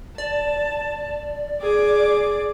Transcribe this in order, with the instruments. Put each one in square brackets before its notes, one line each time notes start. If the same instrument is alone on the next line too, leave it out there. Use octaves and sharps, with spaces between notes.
[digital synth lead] D5 [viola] A5
[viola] G#4 D6